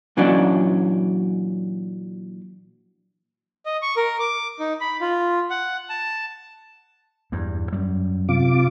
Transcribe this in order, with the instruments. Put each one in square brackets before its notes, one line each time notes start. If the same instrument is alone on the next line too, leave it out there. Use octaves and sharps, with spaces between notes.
[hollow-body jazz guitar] A#2 E3 F#3 C#4 D4 D5
[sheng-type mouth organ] D#5
C#6
A#4
D6
D#4
B5
F4
F#5
A5
[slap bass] E2 G2
F#2 G3
[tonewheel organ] C3 F4 D6